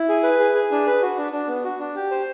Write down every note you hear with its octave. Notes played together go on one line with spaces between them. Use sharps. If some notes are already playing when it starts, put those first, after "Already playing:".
Already playing: E4
G#4
B4
G#4
G#4
D4
B4
F#4
D4
D4
B3
F#4
D4
G4
C5